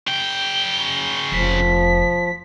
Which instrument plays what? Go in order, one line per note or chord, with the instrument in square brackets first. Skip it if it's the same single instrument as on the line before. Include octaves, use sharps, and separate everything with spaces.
[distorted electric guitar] C#3 G5 [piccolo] G7
[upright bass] F1 [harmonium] F3 [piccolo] B6